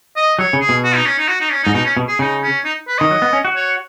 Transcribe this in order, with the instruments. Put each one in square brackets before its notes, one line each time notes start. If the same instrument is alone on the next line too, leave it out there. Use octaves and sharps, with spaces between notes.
[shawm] D#5
[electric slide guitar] F#3 [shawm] C#5
[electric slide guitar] C#3
[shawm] G#4
[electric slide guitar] B2
[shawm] F#4
D#4
C#4
D#4
F#4
D#4
C#4
D#4
[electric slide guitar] G#2
[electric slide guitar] B2 [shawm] D#4
[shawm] C#4
[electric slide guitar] B2
[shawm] G#4
[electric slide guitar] C#3 [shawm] D#4
[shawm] C#4
D#4
B4
[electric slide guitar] D#3 [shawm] D#5
[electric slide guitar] F#3
B3
C#4
F#4
[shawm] C#5